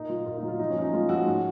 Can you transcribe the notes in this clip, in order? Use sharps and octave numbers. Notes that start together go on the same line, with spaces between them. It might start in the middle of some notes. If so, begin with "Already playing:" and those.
Already playing: A#2 D#4
F#3 F4
A#2 F4
D#4
F#3
F4
F3 D#4
C#4
F3
D#4
G#3 F4
F3 F#4
G#2